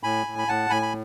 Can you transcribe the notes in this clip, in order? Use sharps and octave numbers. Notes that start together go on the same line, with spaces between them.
A2 G#5 B5
A2
B5
A2 F#5 A5
A2 G#5 B5
B5